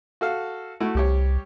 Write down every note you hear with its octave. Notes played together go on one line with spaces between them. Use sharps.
F#4 A4 F5
A3 E4 F#4
C2 G3 G4 C#5